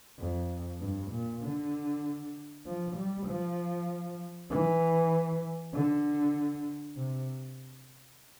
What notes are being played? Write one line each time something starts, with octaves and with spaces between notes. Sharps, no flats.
F2
G2
A#2
D3
F3
G3
F3
E3
D3
C3